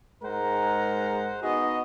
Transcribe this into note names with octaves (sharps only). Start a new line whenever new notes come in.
G#2 G#3 A#4 C5 F#5 A#5
B3 D#4 F#4 G#4 D#5